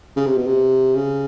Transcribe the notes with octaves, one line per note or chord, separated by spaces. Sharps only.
C#3
C3
B2
C3
C#3